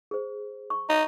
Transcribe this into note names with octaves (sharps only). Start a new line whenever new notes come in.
G#4 C5
C#6
D#4